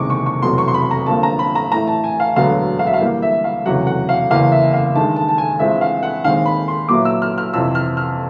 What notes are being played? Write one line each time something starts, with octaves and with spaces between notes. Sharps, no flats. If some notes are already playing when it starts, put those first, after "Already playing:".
Already playing: F#1 E2 C3 D#3 G#3 C#6 D6
C#6
C#6
F1 E2 B2 F#3 C6
C#6
C6
B5
A#5
G1 G2 D3 F3 A#3 A5
A#5
B5
A#5
A2 E3 A3 A#5
A5
G#5
F5
E1 D2 D3 F#3 B3 F5
F5
E5
F5
G2 E3 G3 A#3
E5
F5
F1 E2 C#3 F#3 F#5
F#5
F5
F#1 E2 C#3 E3 F5
E5
F5
G2 D#3 G#3 A5
A5
A5
G#5
G2 E3 G#3 C4 F4 E5
F5
F#5
D#2 D#3 G#3 C4 F5
B5
C6
A#2 F#3 B3 E4 D6
E6
F6
F6
F2 C3 E3 E6
F6
F6